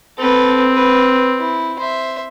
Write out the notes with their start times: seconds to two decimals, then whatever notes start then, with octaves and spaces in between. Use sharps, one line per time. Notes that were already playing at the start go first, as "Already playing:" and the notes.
0.18 C4 A4 B4
0.75 B4
1.38 E4
1.79 C5 E5